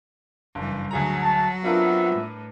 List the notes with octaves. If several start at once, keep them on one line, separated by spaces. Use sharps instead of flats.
F#1 G2 E3
D2 F#3 G#4 A#5
A5
B3 C4 D4 F4 A#4 B4 E5
A2